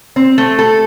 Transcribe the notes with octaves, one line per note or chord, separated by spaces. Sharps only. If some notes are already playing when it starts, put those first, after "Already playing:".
C4
A3
A4